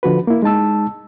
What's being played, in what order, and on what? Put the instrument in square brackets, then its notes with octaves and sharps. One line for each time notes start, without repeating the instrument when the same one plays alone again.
[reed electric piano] D3 F3 F#4 B4
A#3 E4
G#3 D#4 A5 E6